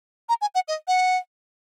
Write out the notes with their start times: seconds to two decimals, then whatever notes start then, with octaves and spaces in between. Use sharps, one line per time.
0.29 A#5
0.41 G#5
0.55 F#5
0.68 D#5
0.88 F#5